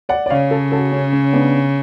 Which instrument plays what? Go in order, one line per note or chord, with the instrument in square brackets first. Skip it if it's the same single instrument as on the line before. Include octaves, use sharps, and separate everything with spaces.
[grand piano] D5 F#5
D5
[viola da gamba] C#3 [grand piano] C#5 F5
[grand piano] A4 C#5
F#4 A4
C#4
C#4
B3 D4